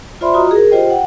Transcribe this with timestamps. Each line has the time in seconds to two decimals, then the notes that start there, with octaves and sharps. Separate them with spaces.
0.21 F4 C5 D5 E5 B5 C6
0.34 F4 F#4 D#5 A#5 D#6
0.51 G#4 A#4
0.71 F4 G4 C5 D#5 G5
0.90 F#5 G5